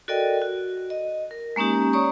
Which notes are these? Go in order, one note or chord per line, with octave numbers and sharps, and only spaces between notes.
F#4 A4 A#4 D5 D#5 G5
F#4
D#5
A#4
G#3 A#3 C#4 D#4 G4
C#5 D5 A#5 C#6 D#6